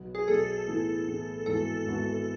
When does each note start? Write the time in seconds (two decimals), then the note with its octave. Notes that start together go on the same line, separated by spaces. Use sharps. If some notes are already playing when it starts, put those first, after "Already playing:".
Already playing: B1 B2 F#3 B3
0.15 G#4
0.28 B1 B2 F#3 B3 A4
0.67 A2 E3 B3 E4 G#4
1.07 A2 E3 B3 E4 G#4
1.46 G#1 G#2 E3 B3 F#4 A4
1.86 G#1 G#2 E3 B3 F#4